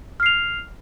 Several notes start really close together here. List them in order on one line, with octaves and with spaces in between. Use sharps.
F6 C7 F7